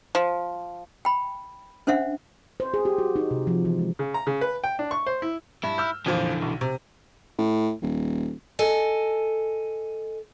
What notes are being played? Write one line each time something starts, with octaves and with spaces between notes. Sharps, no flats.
F3
G5 B5
C#4 D4 C5 E5 F#5
C5
G#4
G4
F#4
D#4
C3
F3
E3
G#3
C#3
A#5
C#3
B4
G5
D4
C#6
C5
E4
G2 E4
E6 F6 G6
F2 A#2 D3 E3 F3
B1
C3
A2
D#1
A4 D#5 G#5